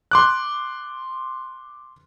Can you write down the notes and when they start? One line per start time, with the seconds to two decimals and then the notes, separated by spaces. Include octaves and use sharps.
0.11 C6 D6 F#6